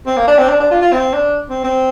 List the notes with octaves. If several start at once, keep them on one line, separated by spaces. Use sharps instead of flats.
C4
A#3
D4
C4
D4
D4
F4
F4
C4
D4
C4
C4